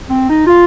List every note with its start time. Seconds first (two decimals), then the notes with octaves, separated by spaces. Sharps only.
0.10 C4
0.29 D#4
0.47 F4